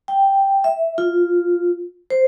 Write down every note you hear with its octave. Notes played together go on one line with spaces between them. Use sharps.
G5
E5
F4
C5